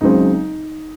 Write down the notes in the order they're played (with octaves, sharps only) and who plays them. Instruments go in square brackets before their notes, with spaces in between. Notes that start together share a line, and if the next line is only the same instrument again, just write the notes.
[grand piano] C#2 C#3 F#3 C4 D#4